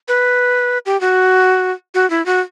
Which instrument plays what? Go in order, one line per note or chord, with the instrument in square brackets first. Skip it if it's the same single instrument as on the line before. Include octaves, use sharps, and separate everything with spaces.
[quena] B4
G4
F#4
F#4
E4
F#4